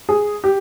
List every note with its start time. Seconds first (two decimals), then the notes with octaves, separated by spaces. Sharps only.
0.09 G#4
0.44 G4